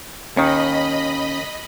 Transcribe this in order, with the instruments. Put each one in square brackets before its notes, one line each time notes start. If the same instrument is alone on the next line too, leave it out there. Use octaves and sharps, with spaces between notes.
[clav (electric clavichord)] D#2 D#3 [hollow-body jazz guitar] C#4 [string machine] D#5 B5